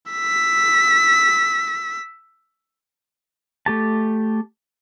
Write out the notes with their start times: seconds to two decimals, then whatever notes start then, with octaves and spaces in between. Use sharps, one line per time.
0.12 E6 B6
3.66 A3 G4 A5